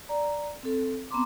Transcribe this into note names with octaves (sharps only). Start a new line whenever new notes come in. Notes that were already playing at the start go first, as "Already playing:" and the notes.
D5 A#5
C4 A4
B3 C4 A#5 C6 D6